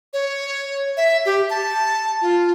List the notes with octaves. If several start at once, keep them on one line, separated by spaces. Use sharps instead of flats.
C#5
E5
G4
A5
F4